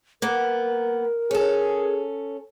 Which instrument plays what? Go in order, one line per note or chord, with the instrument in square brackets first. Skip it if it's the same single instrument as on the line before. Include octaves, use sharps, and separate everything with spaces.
[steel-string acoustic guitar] A#3 B3 F#5 [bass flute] A#4
[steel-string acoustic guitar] C#4 A4 [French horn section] G#4